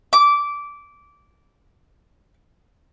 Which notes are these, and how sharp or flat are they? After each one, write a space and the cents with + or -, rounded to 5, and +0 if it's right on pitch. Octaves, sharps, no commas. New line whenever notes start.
D6 -15